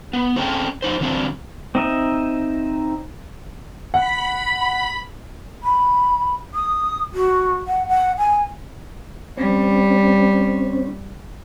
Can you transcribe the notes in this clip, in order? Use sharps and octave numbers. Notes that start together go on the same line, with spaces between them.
B3
C4 C#4 G#4 A4 G5 A5
F3 D#4 C5
D3 E3 F#3 B3 C4 D4
C4 D#4 D#5 E5
F#5 B5
B5
D#6
F#4
F#5
F#5
G#5
G3 C4 C#4